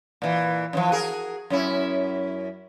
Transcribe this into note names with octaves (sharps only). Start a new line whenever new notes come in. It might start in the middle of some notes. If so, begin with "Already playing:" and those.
A#2 E3
F#2 E3 F3
F#4 G#4 A#4
F#2 C#4 E4